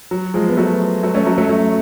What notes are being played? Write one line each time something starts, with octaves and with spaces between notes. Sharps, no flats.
F#3
F3 G#3
B3
F#3 A3
F#3 A3
A3 C#4
F#3 A3
F#3 A3
F#3 A3